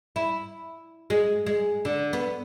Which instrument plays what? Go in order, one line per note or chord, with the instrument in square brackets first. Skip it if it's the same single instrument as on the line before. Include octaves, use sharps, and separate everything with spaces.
[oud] E4
G#3
G#3
D3
B3